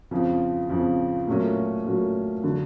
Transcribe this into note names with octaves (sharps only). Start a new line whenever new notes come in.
F2 C#3 F3
F2 C#3 F3
A#2 F#3 A3 C#4 F#4
A#2 F#3 A3 C#4 F#4
D3 F#3